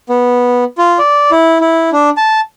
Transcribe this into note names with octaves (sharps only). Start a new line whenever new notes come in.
B3
F4
D5
E4
E4
D4
A5